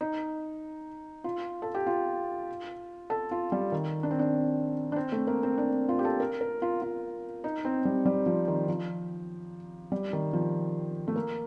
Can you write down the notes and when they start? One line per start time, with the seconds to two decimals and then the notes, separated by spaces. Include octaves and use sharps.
0.01 D#4
1.24 F4
1.62 A4
1.75 G4
1.86 F4
3.10 A4
3.31 F4
3.52 G3
3.72 D#3
4.03 D4
4.11 C4
4.19 D4
4.92 D4
4.96 C4
5.12 A3
5.27 A#3
5.43 C4
5.58 D4
5.89 F4
5.99 G4
6.05 A4
6.20 A#4
6.41 A#4
6.62 F4
6.82 F4
7.44 D#4
7.65 C4
7.85 G3
8.06 G3
8.26 F3
8.48 D#3
8.68 F3
9.92 G3
10.13 D#3
10.33 F3
11.08 A3
11.16 A#3